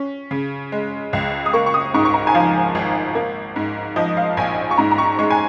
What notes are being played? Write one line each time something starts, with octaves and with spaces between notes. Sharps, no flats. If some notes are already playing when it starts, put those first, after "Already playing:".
Already playing: C#4
C#3
G#3
C#2
D#6
A#3 C#6
C#6
D#6
G#2 C#6
C#6
A#5
G#5
F3 F5
G#1
A#3
G#2
F3 D#5
F5
A#1 G#5
C#6
G#2 A#5
A#5
C#6
G#3 C#6
G#5